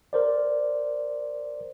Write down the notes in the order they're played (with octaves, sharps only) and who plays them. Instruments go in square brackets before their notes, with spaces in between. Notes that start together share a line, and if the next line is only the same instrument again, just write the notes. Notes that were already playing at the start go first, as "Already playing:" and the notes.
[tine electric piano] A#4 C5 D5